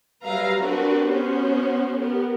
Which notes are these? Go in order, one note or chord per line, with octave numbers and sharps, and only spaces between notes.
F#3 G3 B4 E5 F5 A#5
C4 D4 F#4 G4 A#4 B4
B3 C#4 F#4 C5
B3 G4 A#4